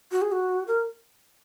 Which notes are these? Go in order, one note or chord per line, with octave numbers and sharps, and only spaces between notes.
F#4
G#4
F#4
A#4